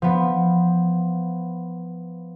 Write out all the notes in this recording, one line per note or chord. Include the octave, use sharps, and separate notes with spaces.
F3 B3